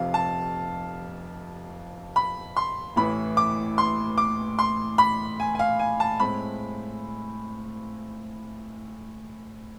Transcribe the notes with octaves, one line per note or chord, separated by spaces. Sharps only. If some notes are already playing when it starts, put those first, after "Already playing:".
Already playing: F1 F2 C3 F3 F5
A5
B5
C6
A1 A2 E3 B5
D6
C6
D6
C6
B5
G#5
G#5
F5
G#5
A5
A2 G#3 C4 B5